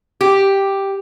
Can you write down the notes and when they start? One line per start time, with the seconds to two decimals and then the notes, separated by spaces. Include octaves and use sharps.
0.21 G4